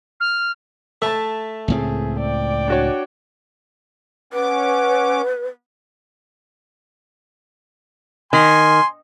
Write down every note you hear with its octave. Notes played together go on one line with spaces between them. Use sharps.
F6
A3 E5 A5
C#2 A2 C4 G#4
D5 G5
D4 F#4 C#5
C#4 B4 F#5 D6
D#3 G#5 C6